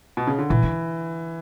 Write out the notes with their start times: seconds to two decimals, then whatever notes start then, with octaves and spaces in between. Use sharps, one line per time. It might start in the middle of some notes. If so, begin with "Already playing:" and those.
0.17 B2
0.27 C#3
0.38 D3
0.50 A#2 E3
0.63 D3